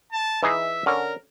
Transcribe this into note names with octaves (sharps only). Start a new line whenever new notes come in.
A5
E3 D#4 G#4 E5
D3 C#4 A#4